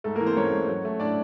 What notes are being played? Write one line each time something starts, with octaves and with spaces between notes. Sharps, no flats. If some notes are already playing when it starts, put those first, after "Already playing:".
G#2 A3 A4
A#3 A#4
E3
C4 C5
G#2 C#4 C#5
G#2
F#3
A3
A2 D4 D5